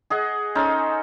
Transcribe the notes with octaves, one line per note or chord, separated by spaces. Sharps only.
G#4 D#5 F#5
C#4 D#4 A4 C5